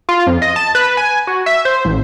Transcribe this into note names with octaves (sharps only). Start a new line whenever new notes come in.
F4
F2
D#5
A5
B4
G#5
F#4
E5
C5
A1